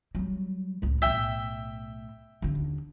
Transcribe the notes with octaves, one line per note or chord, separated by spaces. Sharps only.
F#3 G3
C#2 A2
B1 A2 E5 G5
D#2 D3